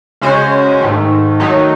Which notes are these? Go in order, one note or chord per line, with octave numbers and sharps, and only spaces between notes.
C#3 G#3 C#4 F#4 C5
G#2 D#3 A3
D#3 F#3 A3 D#4